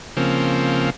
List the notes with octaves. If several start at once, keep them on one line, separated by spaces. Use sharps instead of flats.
C#3 F3 A#3 C4